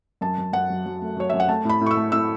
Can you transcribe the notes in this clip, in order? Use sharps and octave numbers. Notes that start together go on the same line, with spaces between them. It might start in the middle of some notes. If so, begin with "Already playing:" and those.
F#2 A5
F#2
F#2 F#5
F#3
F#3
A3
F#3 C#5
F#2 E5
F#5
A3 A5
A2 B5
A2
C#6
E6
A3
A2 E6